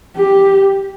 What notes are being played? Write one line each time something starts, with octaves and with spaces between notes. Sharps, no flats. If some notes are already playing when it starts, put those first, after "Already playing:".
G4